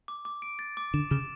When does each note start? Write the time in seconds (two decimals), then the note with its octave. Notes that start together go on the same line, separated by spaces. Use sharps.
0.08 D6
0.25 D6
0.42 D7
0.59 A6
0.77 D6
0.94 D3 E7
1.11 C#3 E7